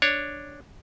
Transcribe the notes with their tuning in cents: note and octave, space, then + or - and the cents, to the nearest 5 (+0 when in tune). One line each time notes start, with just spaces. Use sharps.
D4 +0 C#5 +0